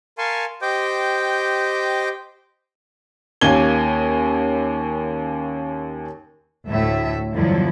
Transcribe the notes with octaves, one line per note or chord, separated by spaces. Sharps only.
A#4 F5 G#5 A5 C6 C#6
G4 C5 D#5 G5 D6 G6
D#2 A#3 C#4 G#6 G7
D2 A2 A3 E5
E2 G2 D3 F3 F#3 E4